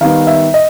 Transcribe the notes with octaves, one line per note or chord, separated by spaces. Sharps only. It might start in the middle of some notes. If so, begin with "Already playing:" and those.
D#3 G3 B3 D#4 F5
E5
D#5